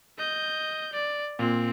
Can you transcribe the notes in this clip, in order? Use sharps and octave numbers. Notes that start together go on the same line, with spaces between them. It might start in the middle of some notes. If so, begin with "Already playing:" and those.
D#5 G6
D5
A#2 C4